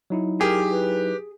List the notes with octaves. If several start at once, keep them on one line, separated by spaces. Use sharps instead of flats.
F#3 D#4 E4
G4 G#4 A#4
B4